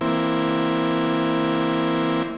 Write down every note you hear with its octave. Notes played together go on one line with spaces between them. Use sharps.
E3 A#3 C4 E4